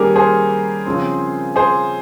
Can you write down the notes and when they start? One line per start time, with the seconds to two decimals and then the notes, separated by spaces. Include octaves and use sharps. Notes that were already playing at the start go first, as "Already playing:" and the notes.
Already playing: D#3 G3 A#3 C#4 G4 G#4 A#4
0.16 G#4 C5
0.86 C#3 F3 C4
1.56 G#4 C5